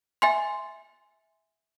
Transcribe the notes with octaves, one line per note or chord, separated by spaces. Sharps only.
E5 G#5 C6